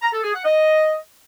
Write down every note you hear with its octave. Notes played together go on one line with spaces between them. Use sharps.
A#5
A4
G#4
F#5
D#5